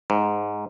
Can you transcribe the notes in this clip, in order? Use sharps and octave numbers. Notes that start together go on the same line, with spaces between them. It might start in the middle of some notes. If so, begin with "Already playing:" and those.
G#2